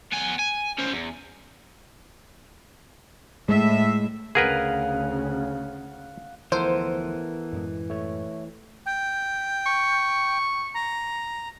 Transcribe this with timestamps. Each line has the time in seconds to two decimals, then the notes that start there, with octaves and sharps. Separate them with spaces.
0.12 B3 G#5
0.39 G#5
0.78 C#4 C5
0.93 E2
3.49 A2 G#3 E5
4.35 D2 C#3 G#4 A#4 B4 F5 F#5
6.52 D2 E3 F3 B3 A4 A#4 C5
7.53 F#2 A2 G#3
7.90 A3 C#5
8.86 G5
9.66 C#6
10.74 A#5